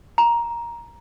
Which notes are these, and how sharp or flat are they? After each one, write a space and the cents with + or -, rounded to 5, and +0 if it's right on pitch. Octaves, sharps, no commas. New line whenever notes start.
A#5 +10